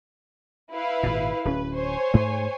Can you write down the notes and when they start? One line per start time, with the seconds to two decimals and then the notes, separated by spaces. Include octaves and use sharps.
0.72 E4 B4 F5
1.03 G#1 A#2
1.45 D1 C#4 B4
1.76 C5 C#5 G#5
2.14 G#2 A3